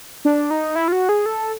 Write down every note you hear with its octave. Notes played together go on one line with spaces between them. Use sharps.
D4
D#4
E4
F4
F#4
G#4
A4